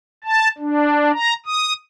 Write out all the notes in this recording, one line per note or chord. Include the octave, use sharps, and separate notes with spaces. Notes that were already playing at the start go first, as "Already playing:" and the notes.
A5
D4
A#5
D#6